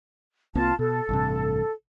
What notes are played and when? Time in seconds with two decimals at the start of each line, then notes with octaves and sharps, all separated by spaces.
0.55 C2 A#3 C4 F4 A5
0.79 B2 A4
1.09 A1 G2 C3